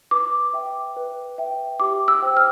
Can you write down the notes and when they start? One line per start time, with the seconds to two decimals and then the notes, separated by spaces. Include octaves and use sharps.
0.11 B4 D6
0.53 E5 G5
0.96 B4
1.38 E5 G5
1.80 G4 D6
2.08 E6
2.22 C5 G5
2.37 F6